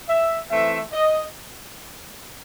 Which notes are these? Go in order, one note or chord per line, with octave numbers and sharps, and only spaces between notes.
E5
E3 A3 C4 E5
D#5